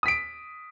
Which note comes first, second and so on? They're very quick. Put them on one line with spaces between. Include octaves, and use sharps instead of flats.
D#6 B6 D7